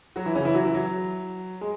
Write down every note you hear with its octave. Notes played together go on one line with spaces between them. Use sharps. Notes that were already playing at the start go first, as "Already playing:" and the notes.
F#3 F#4
E3 E4
C#3 C#4
E3 E4
F#3 F#4
E3 E4
F#3
G#3